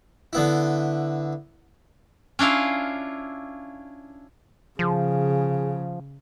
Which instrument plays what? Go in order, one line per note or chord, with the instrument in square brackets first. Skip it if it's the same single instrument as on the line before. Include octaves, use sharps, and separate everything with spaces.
[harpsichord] D3 B3 E4
[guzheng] C#4 D4 E4 F4 F5
[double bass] C#3 [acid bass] F3 [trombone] G#4